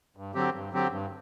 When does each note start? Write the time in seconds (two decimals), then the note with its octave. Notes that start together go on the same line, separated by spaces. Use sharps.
0.17 G2
0.35 D3 F#3 C4 G4
0.54 G2
0.73 D3 F#3 C4 G4
0.91 G2